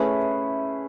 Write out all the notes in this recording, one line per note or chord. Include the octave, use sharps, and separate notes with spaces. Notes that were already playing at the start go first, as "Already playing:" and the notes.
Already playing: A3 C#4 E4 G#4 B4